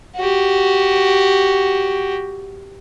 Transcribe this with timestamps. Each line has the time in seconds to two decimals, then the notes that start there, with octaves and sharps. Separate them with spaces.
0.16 F#4 G4